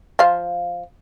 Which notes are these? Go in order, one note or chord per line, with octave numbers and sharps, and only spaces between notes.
F3 F5